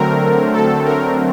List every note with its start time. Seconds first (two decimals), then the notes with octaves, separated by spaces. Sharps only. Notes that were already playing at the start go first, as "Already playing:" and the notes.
Already playing: D3 F#3 A3 C4 A#4
0.53 A4
0.85 A#4